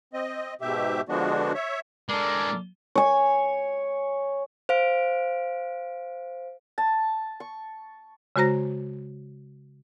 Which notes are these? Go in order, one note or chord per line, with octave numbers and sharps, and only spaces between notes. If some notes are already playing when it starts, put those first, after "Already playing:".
C4 D#5
G#2 B2 G4 E5
D3 F3 G#3 B3 D4 F#4
C#5 E5
G#3 D4 A4 A#4 D5
C#5 G#5
C5 F5 D7
A5
C#6
C#3 G#3 F#4 C5 A#5 A#6